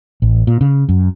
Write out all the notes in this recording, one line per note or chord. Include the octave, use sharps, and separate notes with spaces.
A1
A#2
C#3
F#2